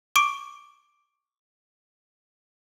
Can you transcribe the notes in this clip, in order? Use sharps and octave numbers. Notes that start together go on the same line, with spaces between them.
C#6 D6 D7